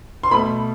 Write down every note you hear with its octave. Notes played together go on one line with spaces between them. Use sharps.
C6
B2 A3 B5